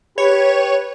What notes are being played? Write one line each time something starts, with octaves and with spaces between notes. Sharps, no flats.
G4 B4 C#5